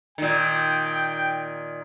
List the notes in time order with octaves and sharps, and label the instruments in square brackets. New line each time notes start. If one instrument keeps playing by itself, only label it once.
[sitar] A#2 D#3 [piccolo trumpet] G5